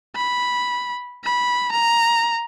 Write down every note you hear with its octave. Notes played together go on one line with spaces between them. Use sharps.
B5
B5
A#5